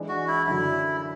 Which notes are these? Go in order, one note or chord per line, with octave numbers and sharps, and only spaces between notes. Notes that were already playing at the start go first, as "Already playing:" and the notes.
Already playing: E3 G#3 D4
F#4
E4
F#2 D3 F#3 E4